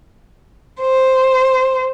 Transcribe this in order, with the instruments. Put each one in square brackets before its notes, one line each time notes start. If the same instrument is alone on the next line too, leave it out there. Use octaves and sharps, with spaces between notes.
[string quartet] C5